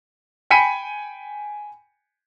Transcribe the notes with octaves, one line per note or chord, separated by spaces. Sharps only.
G5 G#5 B5 B6 C#7 D#7